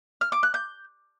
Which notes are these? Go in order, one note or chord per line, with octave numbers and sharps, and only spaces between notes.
F6
D6
F#6
G6